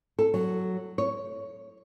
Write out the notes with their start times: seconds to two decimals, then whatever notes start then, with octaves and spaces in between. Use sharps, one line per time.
0.19 A4
0.34 F#3
0.98 C#5